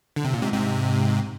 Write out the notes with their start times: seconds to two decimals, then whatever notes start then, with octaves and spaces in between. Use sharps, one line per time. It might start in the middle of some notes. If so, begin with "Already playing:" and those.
0.16 D3
0.25 C3
0.33 A#2
0.42 G#2 C3
0.53 G#2 C3